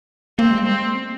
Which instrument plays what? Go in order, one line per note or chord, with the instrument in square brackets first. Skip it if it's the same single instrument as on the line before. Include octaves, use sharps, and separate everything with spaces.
[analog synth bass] A#3 [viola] C4
[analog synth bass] G#3
[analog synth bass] G3 [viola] C4
[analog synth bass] G#3
A#3
C4